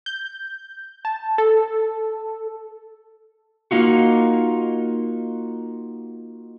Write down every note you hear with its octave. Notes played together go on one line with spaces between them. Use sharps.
G6
A5
A4
A#3 D#4 F4 F#4